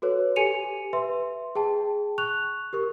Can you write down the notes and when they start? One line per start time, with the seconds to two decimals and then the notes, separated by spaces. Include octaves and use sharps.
0.02 F#4 A4 B4 C#5
0.36 G4 A4 G#5 C#7 D#7 F7
0.93 B4 E5 C6
1.55 G#4 G5 A5
2.18 C#6 F#6 F7
2.73 G4 A#4 C#6